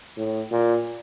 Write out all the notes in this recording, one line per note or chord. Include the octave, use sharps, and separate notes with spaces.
A2
A#2